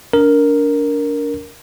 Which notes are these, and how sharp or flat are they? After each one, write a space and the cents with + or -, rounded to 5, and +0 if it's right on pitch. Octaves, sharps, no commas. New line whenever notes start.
D4 -30 A#4 +0